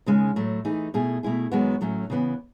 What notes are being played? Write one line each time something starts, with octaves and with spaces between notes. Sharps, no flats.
D#2 C#3 G#3 C#4
A2 F#3 A3
E3 A3 D#4 G#4
B2 A3 E4 G#4
B2 A3 E4 G#4
F#2 D#3 G#3 B3 F#4
A2 F#3 A3 C#4
C#3 E3 B3